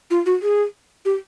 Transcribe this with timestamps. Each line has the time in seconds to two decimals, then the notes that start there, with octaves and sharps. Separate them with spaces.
0.11 F4
0.26 F#4
0.42 G#4
1.05 G4